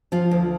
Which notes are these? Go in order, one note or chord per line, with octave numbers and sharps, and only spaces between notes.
F3 F4
D2